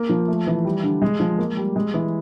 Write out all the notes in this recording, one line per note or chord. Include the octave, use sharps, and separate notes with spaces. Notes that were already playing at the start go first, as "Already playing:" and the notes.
Already playing: A#3
F3
A3
E3
G3
D3
G#3
F3
A#3
G3
G#3
E3